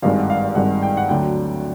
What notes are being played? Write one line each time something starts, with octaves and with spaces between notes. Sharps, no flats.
G#1 G2 D#3 G#3 F5
F#5
F5
G#1 G2 D#3 G#3 F#5
G5
F#5
D2 D3 F#3 G5